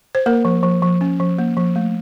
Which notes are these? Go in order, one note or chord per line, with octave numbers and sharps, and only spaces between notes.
C5
A#3 A#4
F3
F3
F3
C#4
F3
A#3
F3
A3